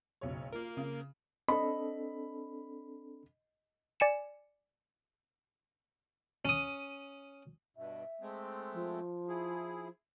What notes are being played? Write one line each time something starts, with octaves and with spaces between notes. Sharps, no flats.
F#1 B1 C#5
A#3 F4 A#4
C#3
C4 D4 A4 D#5 B5
D5 G#5 C#7 E7
C#4 D#6
G2 B2 E5
G#3 A3 C4
F3
E4 G#4